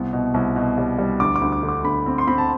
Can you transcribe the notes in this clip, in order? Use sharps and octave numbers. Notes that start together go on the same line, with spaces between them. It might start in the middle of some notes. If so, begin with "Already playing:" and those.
Already playing: C2 B3
B2
C2
B2
G3
G3
D2 D6
D6
D2
D6
D3
D6
D2 B5
C4
C6
C4 B5
A5